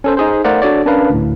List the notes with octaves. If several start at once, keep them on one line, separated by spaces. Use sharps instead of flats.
C#4 A4 C5
D#4 G#4 C5
A3 A#4 C5 D5 F5 F#5
D4 F#4 A4 C#5 D5
C#4 D4 A#4 B4 F5
D2 A2